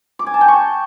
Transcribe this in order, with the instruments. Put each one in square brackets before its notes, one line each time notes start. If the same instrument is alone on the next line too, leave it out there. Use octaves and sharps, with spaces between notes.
[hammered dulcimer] D6
G#5
A5
G5
C#6